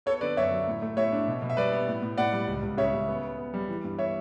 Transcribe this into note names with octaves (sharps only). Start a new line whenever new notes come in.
B3 A4 C#5
D3 B4 D5
F#2 C#5 E5
F#3
A2
A3
A2 C#5 E5
D4
B2
B2
E5
G3 B4 D5
B3
A2
A2
A2 D5 F#5
G3
C#2
C#2
C#3 C#5 E5
C#3
B3
B3
B3
G3
E3
G2
B3 C#5 E5